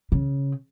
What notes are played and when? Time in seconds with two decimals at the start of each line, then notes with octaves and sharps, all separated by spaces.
0.12 C#3